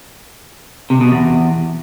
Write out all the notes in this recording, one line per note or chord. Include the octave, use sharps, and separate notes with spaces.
C3
B2
E2